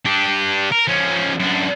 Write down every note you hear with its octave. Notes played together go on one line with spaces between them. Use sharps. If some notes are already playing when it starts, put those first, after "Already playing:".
D4 G4
A#4
F3 C#4
F#2 D4